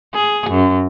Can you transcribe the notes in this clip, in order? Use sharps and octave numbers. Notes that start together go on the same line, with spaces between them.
G#4
F#2